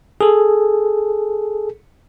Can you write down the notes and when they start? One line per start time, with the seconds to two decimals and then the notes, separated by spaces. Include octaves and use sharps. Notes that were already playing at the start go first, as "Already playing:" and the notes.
0.21 G#4 A4